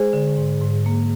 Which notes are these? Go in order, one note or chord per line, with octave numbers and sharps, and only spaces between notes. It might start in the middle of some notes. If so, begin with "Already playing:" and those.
Already playing: G#3 G#4 C5
D3
G#2
G#2
A#3